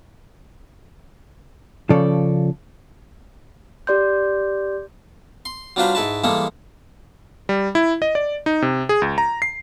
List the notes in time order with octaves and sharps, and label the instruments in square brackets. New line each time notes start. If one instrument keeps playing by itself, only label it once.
[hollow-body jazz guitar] C#3 F3 C#4 A4 D5
[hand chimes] G4 D5 C6 G6
[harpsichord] C6
F#3 G3 D4 F4 B4 C5
G#2 E4 B4 A5
E3 G3 G#3 A#3 A4
[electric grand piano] G3
E4
D#5
D5
D#4
C3
G#4
C#2
A#5
C7